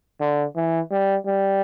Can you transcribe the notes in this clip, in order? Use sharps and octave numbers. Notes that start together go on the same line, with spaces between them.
D3
E3
G3
G3